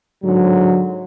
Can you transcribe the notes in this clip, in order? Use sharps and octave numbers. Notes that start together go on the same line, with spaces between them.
G#2 D3 F#3